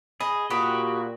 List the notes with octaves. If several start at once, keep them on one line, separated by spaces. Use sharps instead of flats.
G#4 D#5 B5
A#2 F#4 G4 B5 D#6 B6